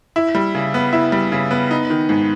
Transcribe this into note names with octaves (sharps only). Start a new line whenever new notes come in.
E4
G3
C#3
B3
E4
G3
C#3
B3
D#4
D#3
G#2